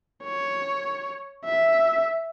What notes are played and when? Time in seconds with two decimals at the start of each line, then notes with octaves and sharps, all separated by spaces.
0.24 C#5
1.46 E5